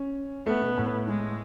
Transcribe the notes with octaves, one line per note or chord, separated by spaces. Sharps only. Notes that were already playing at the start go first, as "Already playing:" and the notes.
Already playing: C#4
A3 B3
B2
A2
G#3